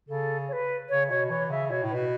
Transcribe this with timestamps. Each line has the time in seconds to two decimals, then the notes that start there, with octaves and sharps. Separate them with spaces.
0.09 C#3 A4
0.48 C#5
0.53 B4
0.89 C#3 C#5
1.09 B2 C#5
1.30 E3 C#5
1.50 C#3 E5
1.70 B2 C#5
1.83 A2
1.90 B2 B4